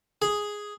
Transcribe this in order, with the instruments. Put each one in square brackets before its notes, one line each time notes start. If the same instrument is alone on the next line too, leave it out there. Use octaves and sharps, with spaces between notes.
[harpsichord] G#4